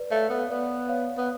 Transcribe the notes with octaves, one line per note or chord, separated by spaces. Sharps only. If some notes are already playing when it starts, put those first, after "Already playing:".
Already playing: B4 D5
A3 C#5 F5
B3
F5
B3 B4 D5
C#5 F5
B3